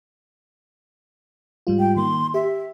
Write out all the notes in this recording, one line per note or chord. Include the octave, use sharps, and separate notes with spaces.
G#2 G3 F4
G5
D#3 A#3 C6
G4 E5